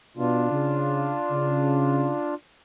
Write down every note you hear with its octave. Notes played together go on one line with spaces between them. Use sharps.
B2 D4 F4
C#3
C#3